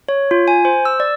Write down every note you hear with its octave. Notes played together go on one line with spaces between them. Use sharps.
C#5
F4
G#5
C5
E6
D5